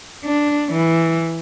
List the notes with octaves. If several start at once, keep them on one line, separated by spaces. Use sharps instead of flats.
D4
E3